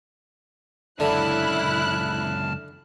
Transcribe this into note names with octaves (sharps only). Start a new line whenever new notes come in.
C#2 F#2 D3 E4 A5 F6 F#6